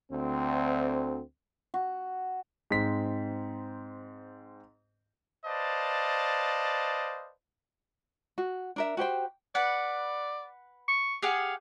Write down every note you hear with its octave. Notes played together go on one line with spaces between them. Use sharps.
D2 C4
F#4
G#2 C4 B6
B4 C5 D5 D#5 F5 A5
F#4
D4 A#4 E5
F#4 G4 C5 G5
B4 D5 F#5
C#6
G4 G#4 F5 F#5